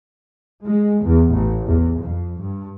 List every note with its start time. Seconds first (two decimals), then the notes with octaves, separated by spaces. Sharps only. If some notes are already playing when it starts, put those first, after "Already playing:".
0.64 G#3
1.03 E2
1.32 A1
1.68 E2
2.01 F2
2.41 G2